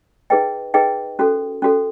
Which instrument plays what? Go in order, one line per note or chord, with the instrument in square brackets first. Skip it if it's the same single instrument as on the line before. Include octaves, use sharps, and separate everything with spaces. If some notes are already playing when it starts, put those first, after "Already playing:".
[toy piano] D#4 G#4 B4 D#5 G5
D#4 G#4 B4 D#5 G5
C#4 F#4 A4
C#4 F#4 A4